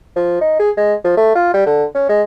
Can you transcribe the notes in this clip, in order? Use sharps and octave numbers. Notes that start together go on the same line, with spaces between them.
F3
D#4
G#4
G#3
F3
A3
F4
G3
D3
C#4
G#3